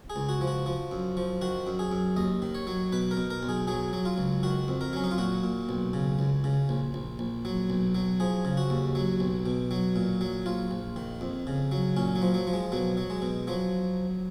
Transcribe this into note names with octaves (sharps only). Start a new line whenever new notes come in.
G#4
C#2
F#4
F3
F#4
F3
F#2
F3
D#3 F#4
F#2
G#4
F#2
D#2 D#5
D#3
C#5
F#3
B2 B4
A#4
B2
A#4
B1
G#4
F#3 G#4
F#3
F4
C#2
D#3 F#4
F2
A#4
F#3 C#4
D#4
F4
A#2 F#4
A#2
B1
C#3
C#2
C#3
A#1
A#1
A#1
F#3
B1
F#3
F3 G#4
C#3
F#4
D#2
F#3
B1
B2
F#3
A#2
F#3
A#1 F4
A#1
D#3
F2
C#3
F#3
A#2 C#4
F#3
F3
F#3
F3
G#3
B2 F#3
F#3
G#3
B2
F3 F#3